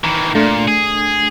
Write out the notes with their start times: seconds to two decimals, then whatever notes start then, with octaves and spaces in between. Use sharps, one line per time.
0.04 D#3 E3
0.35 A#2 A3 D4
0.68 G#4